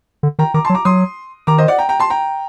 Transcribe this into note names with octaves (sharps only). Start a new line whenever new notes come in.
D3
D#3 G5 A#5
D#3 A#5 D6
A5 C6
F#3
A#5 D6
F#3 C6 D#6
D#3 A#5 D6
C5 D#5
D5 F#5
G5 A#5
G5 A#5
A5 C6
G5 A#5